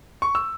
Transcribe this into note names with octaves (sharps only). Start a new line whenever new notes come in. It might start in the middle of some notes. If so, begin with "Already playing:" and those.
C#6
E6